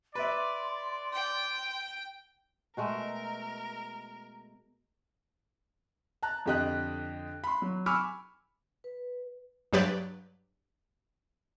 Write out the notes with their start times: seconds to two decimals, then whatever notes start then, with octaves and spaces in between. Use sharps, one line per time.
0.15 B4 D5 E5 C6
1.13 G5
2.77 B2 G#3 A3 A#4
6.23 A5 A#5 F#6
6.46 F2 D3 G4 D#5 F#6
7.44 B5 C6
7.62 F#3
7.86 G#5 B5 C#6 D6 E6 F6
8.84 B4
9.73 G2 F#3 G4 B4 D5 G6